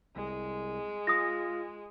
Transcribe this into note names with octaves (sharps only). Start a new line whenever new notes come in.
C2 G#3
F4 D#6 A#6